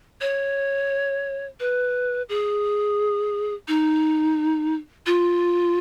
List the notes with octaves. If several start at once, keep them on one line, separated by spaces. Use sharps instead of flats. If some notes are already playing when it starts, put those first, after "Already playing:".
C#5
B4
G#4
D#4
F4